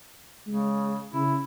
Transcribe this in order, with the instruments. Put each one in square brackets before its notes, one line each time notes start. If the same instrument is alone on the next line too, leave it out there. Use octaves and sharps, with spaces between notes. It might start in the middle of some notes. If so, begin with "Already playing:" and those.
[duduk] C#3 [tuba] G#3
[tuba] C#3 [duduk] E4